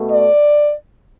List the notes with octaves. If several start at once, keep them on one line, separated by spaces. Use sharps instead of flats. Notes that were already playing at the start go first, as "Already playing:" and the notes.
Already playing: B2 A3
D5